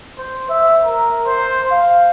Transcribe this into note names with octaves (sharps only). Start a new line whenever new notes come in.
C5
E5
A#4
C5
F5